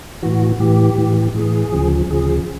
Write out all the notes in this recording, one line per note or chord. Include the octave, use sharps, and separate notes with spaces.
A2 E3 F#4
A2 E3 G4
A2 E3
A2 E3 G#4
D2 C#3 F3
D2 C#3 F3 G#4